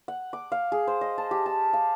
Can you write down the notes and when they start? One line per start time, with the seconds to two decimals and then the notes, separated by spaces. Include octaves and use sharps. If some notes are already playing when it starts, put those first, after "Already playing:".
0.08 F#5
0.33 D6
0.52 F5
0.72 G#4
0.87 C5
1.01 D#5
1.18 A5
1.31 G4
1.46 A5
1.73 F5